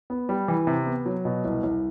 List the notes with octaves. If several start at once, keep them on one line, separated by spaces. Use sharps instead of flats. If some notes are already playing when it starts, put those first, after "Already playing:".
B3
G3
E3
C3
B3
F#3
B2
C2
C2